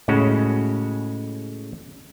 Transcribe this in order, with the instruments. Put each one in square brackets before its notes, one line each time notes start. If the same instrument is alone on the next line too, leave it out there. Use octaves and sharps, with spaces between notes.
[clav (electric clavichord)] A2 C#3 G#3 C#4 F#4